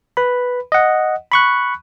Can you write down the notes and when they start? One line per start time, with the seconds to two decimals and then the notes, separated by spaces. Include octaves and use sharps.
0.17 B4 B5
0.72 D#5 F#5
1.32 B5 C#6 F#6